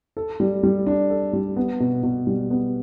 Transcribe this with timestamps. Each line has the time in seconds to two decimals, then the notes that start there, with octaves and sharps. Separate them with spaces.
0.17 A4
0.40 G3
0.63 G3
0.86 D4
1.10 A4
1.33 G3
1.56 B3
1.80 B2
2.03 B2
2.27 G3
2.50 B3